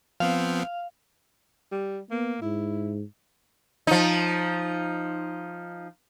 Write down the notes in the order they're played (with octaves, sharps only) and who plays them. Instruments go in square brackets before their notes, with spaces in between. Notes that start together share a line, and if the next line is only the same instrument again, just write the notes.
[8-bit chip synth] F3 B3 C4 [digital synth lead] F5
[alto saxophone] G3
[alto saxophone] A#3 [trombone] B3
[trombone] G#2 [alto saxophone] E4
[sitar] F3 D#4